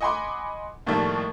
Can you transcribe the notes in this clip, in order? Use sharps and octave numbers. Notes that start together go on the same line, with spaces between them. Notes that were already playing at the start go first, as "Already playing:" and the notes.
D#5 F#5 G#5 B5 C6 D6
D#2 A2 D#3 F3 G3 A#3